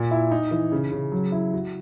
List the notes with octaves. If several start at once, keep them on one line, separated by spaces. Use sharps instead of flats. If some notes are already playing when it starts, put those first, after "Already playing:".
Already playing: A#2
E4
D#4
E3
C#3
C#3
F#3
E4
F#4